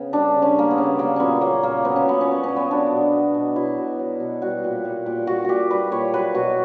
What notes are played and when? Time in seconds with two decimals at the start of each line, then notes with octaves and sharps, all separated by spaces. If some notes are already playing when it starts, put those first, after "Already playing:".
Already playing: C#3 B3
0.13 G3 D4
0.35 C#3
0.42 C#4
0.56 G3 A#3
0.71 B3
0.78 C#3
0.98 F#3 A#3
1.16 A#2 B3 C#4
1.41 F#3 A#3
1.63 A#2 A#3
1.85 F#3 B3
1.96 C#4
2.06 A#2 B3
2.21 C#4
2.28 F#3 B3
2.44 C#4
2.49 A#2
2.56 B3
2.71 F#3 D4
2.92 B2
3.13 F#3
3.34 B2
3.56 F#3 E4
3.78 B2
3.99 F#3
4.20 B2
4.42 G3 F#4
4.64 A#2
4.85 G3
5.06 A#2
5.27 G3 F#4
5.44 A#2 F#4 G4
5.70 G3 B4
5.92 A#2 C#5
6.14 F#3 B4
6.34 B2 F#4